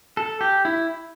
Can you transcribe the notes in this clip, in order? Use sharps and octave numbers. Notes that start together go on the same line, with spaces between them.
A4
G4
E4